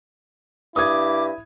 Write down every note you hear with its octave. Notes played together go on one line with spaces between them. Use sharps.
G2 E4 D6 D#6 G#6